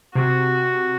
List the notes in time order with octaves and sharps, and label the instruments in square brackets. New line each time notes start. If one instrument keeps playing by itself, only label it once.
[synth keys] C3 [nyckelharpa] F#4